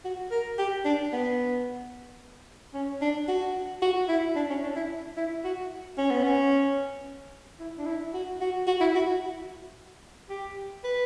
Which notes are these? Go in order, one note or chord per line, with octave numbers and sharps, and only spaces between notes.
F#4
A#4
G4
D4
B3
C#4
D4
F#4
F#4
E4
D4
C#4
D4
E4
E4
F#4
C#4
B3
C#4
E4
D4
E4
F#4
F#4
F#4
E4
F#4
G4
B4